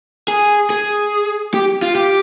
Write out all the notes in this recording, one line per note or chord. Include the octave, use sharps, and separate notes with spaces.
G#4
G#4
G4
F4
G4